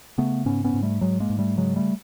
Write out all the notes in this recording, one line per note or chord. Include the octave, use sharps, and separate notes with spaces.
C#3 A3 B3
G#2 B3 C#4
B3 C#4
G#2
G3 A3
G#2 F#3 G#3
G#3 A#3
G#2
G3 A3
C#3 F#3 G#3
G3 A3